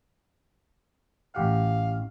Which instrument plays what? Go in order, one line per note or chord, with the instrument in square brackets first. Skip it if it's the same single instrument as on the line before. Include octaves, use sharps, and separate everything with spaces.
[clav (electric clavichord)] A1 G4 F#5 [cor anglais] F5